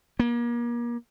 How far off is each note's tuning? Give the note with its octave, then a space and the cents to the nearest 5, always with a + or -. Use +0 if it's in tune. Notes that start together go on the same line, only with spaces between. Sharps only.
A#3 +35